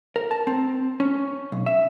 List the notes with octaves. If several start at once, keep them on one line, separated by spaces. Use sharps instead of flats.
A#4
A5
C4
C#4
B1
E5